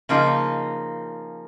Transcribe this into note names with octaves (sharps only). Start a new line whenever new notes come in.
C#3 F3 A#3 D#4